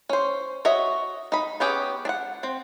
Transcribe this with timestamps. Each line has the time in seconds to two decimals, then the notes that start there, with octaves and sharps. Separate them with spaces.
0.09 C#4 C5
0.65 F#4 C#5 D#5 E5
1.32 D#4 B5
1.60 B3 C#4 G4 G#4
2.05 D4 F#5
2.43 C4